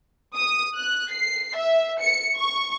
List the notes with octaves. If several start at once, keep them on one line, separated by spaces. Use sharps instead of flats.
D#6
F#6
C7
E5
C#7
C#6